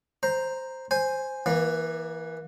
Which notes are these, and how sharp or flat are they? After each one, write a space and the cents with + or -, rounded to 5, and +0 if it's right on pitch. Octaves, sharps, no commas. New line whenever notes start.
C5 +0 A#5 +0
C5 +0 G#5 +0
E3 +0 A#3 +35